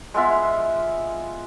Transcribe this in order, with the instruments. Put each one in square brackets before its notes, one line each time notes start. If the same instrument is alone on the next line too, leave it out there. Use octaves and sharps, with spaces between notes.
[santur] G#3 B3 F4 E5